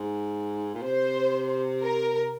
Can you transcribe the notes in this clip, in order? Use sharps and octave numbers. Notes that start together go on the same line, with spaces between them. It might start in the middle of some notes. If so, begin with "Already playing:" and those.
Already playing: G#2
A#2
C3 C5
A#4